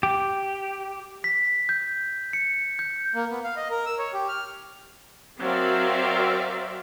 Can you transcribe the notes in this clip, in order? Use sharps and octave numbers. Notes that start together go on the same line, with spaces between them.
G4
B6
G6
C#7
G6
A#3
B3
F5
D#5
A#4
E6
C#5
G4
F6
F#3 C4 A#4 D5 E5 F5